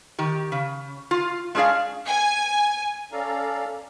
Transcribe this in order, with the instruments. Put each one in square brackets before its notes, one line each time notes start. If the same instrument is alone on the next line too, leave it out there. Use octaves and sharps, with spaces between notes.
[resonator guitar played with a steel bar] D#3 G4
C#3
F4
G#3 C#4 D4 G#4 D5 F5
[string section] G#5
[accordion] C#4 A4 D5 F5 A#5